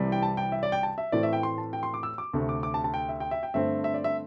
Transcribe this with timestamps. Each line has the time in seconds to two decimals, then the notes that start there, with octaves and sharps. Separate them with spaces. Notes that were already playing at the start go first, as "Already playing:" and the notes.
Already playing: C2 C3 E3 G3
0.12 G5
0.22 A5
0.37 G5
0.52 E5
0.63 D5
0.72 G5
0.83 A5
0.98 E5
1.12 A2 E3 A3 C4 D5
1.23 E5
1.33 G5
1.43 C6
1.58 A5
1.73 G5
1.83 C6
1.94 D6
2.03 E6
2.18 D6
2.33 D2 C3 A3
2.49 D6
2.63 D6
2.74 A5
2.84 A5
2.94 G5
3.09 E5
3.20 G5
3.31 E5
3.43 G5
3.54 G2 D3 A3 C4 E5
3.84 E5
3.94 D5
4.04 E5